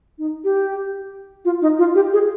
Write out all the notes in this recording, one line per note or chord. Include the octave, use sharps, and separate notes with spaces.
D#4
G4
F4
D#4
F4
G4
G#4